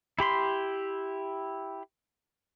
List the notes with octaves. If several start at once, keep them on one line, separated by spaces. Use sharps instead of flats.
E4 G4 B5 C6